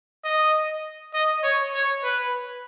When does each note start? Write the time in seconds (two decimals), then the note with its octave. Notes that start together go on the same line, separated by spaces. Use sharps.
0.24 D#5
1.14 D#5
1.44 C#5
1.74 C#5
2.04 B4